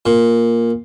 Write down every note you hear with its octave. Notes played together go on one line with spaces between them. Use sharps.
A#2